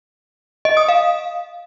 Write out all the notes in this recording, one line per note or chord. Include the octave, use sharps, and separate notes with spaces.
D#5
D#6
F5